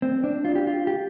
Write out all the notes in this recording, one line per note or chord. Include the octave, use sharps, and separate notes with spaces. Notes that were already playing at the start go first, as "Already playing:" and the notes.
C4
D4
F4
G4
F4
G4